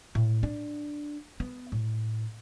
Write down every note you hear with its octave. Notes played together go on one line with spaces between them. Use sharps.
A2
D4
B3
A2